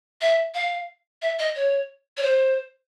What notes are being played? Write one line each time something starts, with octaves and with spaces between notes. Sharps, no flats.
E5
F5
E5
D#5
C#5
C#5
C5